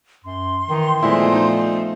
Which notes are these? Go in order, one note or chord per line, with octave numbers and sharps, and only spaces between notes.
F#2 C6
D#3 E3
A#2 F3 G#3 A3 B3 C4 E4
D#4 C5